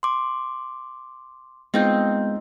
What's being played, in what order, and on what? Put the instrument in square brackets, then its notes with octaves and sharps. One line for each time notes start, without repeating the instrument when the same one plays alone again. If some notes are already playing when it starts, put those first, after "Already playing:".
[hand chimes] C6 D6
[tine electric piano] G#3 [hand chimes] B3 G6 [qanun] C4 D#4 F4